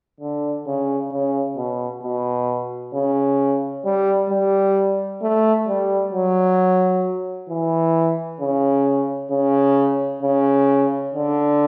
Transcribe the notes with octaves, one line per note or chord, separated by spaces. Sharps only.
D3
C#3
C#3
B2
B2
C#3
G3
G3
A3
G3
F#3
E3
C#3
C#3
C#3
D3